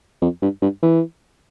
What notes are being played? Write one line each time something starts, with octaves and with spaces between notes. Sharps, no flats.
F2
G2
G2
E3